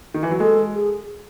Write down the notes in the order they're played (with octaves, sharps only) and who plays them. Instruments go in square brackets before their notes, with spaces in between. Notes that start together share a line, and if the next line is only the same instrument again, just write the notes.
[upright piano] D#3
E3
F#3
[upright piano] G#3 [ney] A4
[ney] G#4